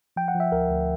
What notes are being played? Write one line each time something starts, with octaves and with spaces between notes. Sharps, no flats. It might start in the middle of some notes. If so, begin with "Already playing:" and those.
F3 G5
F#5
F3
E5
D2 A#4
D2